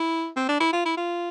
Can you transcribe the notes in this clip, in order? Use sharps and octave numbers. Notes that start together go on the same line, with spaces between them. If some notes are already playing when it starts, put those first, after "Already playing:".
Already playing: E4
C4
D4
E4
F4
E4
F4